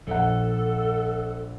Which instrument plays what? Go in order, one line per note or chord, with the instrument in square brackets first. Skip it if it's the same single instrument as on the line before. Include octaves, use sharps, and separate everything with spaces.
[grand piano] A#1 F#5 [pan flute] A4